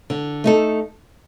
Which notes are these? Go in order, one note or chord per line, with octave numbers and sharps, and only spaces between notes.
D3
A3 D#4 A4